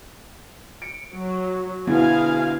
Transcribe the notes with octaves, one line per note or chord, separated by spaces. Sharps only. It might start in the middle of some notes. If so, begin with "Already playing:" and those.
C#7 D7
F#3
D2 B2 B3 E4 G#4 F5 G#5